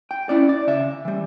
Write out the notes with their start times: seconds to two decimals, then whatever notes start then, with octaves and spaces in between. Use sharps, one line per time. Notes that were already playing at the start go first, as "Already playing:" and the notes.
0.11 G5
0.29 C#4 E4 D5
0.49 D5
0.67 C#3 E5
1.05 E3 G3